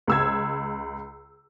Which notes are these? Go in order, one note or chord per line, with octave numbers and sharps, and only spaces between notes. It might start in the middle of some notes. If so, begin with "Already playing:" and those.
C#2 E6 G#6